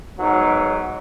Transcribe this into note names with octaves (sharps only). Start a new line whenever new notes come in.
B1 G#2 F#3